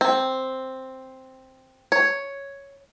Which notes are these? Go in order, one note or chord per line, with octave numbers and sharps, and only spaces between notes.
C4
C#5